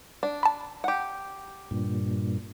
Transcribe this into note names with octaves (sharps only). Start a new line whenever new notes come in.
D4
A5 B5
G4 F#5
G2 A#2